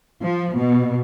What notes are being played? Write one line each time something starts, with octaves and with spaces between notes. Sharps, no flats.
F3
B2